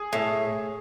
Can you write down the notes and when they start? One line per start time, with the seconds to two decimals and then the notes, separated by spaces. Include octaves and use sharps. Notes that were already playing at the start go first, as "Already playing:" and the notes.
Already playing: G#4
0.13 A2